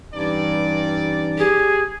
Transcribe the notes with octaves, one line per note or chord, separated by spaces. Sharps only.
G2 E3 C#4 D#4 D5
G4 G#4